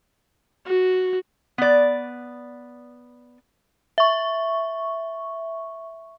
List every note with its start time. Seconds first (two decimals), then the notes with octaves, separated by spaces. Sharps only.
0.66 F#4
1.58 B3 D5
3.98 E5 C#6